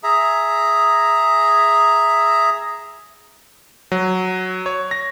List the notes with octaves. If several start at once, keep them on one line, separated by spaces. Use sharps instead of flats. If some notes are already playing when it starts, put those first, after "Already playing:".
G#4 E5 A#5
F#3
C#5
A#6